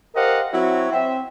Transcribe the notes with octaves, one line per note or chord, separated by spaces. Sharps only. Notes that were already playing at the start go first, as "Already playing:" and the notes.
G4 A#4 C5 D#5 F5 F#5
F#3 C4 E4 F#4 C#5
C4 E5